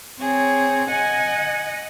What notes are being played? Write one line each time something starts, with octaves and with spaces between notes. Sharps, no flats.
C4 G#4 C#5
D#5 F#5 G#5